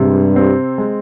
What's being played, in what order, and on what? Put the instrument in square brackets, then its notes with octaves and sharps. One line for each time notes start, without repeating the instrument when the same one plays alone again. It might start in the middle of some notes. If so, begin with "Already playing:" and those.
Already playing: [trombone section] G2 [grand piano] C3 G#3
[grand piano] C4
G#3